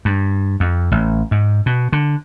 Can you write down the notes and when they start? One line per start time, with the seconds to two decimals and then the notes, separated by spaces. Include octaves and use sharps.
0.05 G2
0.60 F2
0.92 A1
1.31 G#2
1.66 B2
1.92 D3